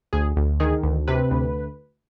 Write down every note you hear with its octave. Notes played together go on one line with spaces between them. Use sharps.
D2 G#4
D2
D#3 G#4
D2
C3 B4
D2